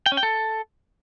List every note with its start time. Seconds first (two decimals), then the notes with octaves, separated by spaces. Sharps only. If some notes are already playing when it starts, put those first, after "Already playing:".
0.06 G5
0.12 C#4
0.17 G5
0.23 A4